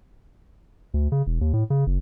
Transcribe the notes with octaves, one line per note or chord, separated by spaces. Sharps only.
D2
C#3
E1
D#2
A2
C#3
F#1